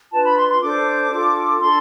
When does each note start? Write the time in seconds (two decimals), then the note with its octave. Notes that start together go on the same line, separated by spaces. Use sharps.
0.12 D4 F4 B4 A5
0.24 B5
0.37 C6
0.49 C6
0.61 D4 A4 C5 D6
1.11 D4 F4 A4
1.61 D4 A4 C6